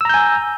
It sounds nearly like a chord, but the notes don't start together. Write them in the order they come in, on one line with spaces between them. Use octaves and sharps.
E6 A#5 G6 G#5